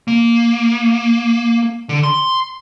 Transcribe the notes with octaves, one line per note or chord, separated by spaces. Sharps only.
A#3
D3
C6